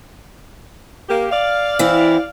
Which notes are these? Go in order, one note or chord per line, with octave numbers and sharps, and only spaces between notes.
A#3 G4
D5 F5
E3 C4 E4